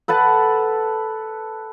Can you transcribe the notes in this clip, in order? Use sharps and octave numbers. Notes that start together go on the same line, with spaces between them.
A4 B4 F#5 A5